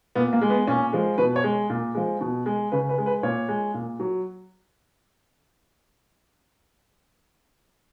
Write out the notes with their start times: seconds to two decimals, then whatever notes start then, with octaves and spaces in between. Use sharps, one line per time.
0.15 A#2 B3
0.33 A#3
0.41 G#3
0.50 B3
0.67 A#2 C#4
0.93 F3 G#3
1.18 B2 B4
1.36 C#5
1.44 G#3
1.70 A#2
1.95 F3 G#3
2.21 B2
2.46 G#3
2.72 C#3 B4
2.89 B4
2.98 G#3
3.06 B4
3.23 A#2 C#5
3.49 G#3
3.74 A#2
4.00 F#3